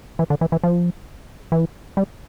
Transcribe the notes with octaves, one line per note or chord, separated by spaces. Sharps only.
E3
D3
E3
E3
F3
E3
G3